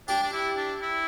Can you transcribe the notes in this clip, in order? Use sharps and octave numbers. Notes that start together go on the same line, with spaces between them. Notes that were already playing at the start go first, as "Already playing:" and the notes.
D4 G4
D4
E4
D4
E4